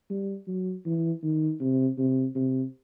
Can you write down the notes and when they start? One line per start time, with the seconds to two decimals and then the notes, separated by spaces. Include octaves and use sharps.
0.10 G3
0.47 F#3
0.86 E3
1.23 D#3
1.60 C3
1.98 C3
2.35 C3